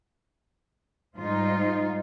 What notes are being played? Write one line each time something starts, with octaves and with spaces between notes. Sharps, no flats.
G#2 G3 D#4 F4 C5